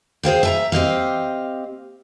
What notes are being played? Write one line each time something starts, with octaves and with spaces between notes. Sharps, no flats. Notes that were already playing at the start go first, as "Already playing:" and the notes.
G#4 C5 F5 G5
E5 G#5 A#5
C4 G4 D#5 F5